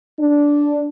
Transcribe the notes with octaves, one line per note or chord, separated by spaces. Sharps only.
D4